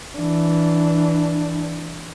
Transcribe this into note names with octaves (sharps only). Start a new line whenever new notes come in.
E3 D4